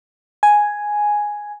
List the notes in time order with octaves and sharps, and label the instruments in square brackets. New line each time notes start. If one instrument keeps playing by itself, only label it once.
[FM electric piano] G#5